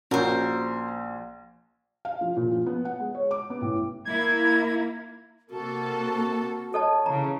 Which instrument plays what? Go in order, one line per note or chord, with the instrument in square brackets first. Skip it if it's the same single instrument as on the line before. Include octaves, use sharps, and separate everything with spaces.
[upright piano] A#1 [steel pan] C#4 F#4 [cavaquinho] A#4 C5
[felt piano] F5
F3
A#2
F3
B3
F#5
G#3
C#5
D6
B3
A1
[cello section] A#3 E4 [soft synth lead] G#6
[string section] C3 A#3 A4 [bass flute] F#4
[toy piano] A4 D#5 A5 [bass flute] C#5
[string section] C#3 E3 [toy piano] A#5